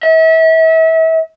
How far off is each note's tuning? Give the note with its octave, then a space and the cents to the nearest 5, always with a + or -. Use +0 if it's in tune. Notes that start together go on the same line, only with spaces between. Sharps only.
E5 -35